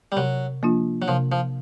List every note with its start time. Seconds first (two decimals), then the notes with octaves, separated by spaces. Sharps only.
0.12 G3
0.17 C3 F#3
0.63 F3 A#3 D4 F4
1.02 F#3
1.08 C3 F3
1.32 F3